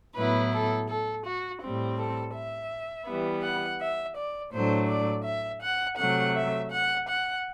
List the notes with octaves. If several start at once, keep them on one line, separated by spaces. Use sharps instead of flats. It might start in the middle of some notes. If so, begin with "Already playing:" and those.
A2 F#3 B3 E4 B4
A4
A4
F#4
A2 G3 C4
A4
E5
E3 G3 B3
F#5
E5
D5
A2 F#3 A3 D4 C5
D5
E5
F#5
C3 F#3 A3 F#5
E5
F#5
F#5